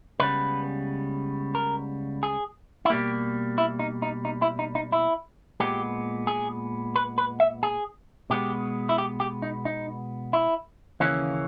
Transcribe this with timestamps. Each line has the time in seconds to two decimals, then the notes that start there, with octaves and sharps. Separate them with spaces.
0.20 C#2 C#3 G3 B3 B4
1.55 A#4
2.23 G#4
2.85 E4
2.90 B2 G3 A#3 G4
3.58 E4
3.79 D#4
4.02 D#4
4.25 D#4
4.42 E4
4.59 D#4
4.75 D#4
4.92 E4
5.60 A#2 G#3 B3 G4
6.27 G#4
6.96 B4
7.18 B4
7.40 E5
7.63 G#4
8.30 B2 G#3 B3 G4
8.89 E4
8.98 G4
9.20 G4
9.42 D#4
9.65 D#4
10.33 E4
11.00 D#2 C#3 E3 A#3 C#4